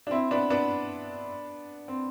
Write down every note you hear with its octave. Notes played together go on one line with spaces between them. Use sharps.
D4
C4 E4
B3 D4
B3 D4
C4